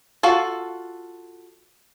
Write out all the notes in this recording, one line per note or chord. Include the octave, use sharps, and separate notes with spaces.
F4 F#4 A4 F5